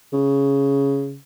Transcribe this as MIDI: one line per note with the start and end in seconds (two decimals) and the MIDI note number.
0.13 1.17 49